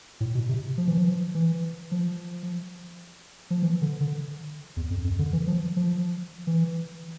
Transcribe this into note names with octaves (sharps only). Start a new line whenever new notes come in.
A2
B2
C3
F3
E3
F3
E3
F3
F3
E3
D3
D3
E2
F2
F2
D3
E3
F3
F3
E3